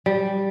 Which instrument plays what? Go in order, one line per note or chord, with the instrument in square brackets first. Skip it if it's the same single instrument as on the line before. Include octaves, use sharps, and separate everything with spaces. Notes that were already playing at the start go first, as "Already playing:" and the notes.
[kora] G3